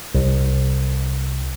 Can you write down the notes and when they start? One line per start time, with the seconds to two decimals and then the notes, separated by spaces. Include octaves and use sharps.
0.15 C2